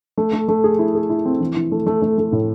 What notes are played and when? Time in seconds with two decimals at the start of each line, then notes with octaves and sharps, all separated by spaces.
0.17 A3
0.33 A3
0.48 A3
0.64 G#4
0.79 E4
0.95 G#4
1.10 E4
1.25 C4
1.40 E3
1.56 E3
1.72 A3
1.86 A3
2.02 A3
2.18 A3
2.32 A2